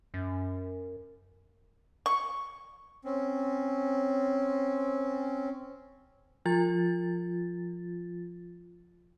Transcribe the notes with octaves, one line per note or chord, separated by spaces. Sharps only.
F#2
C#6
C4 C#4
F3 F4 A6